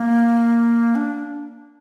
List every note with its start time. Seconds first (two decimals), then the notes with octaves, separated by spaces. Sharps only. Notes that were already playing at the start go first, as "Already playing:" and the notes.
Already playing: A#3
0.95 D4